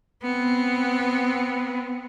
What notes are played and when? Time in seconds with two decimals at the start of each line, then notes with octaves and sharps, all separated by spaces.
0.23 B3 C4